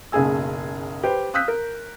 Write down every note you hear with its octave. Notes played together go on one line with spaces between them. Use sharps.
F#1 B1 C#3 G#4 G#5 E6
G4 B4 C5
F5 D#6 E6 F#6 G6 B6
A#4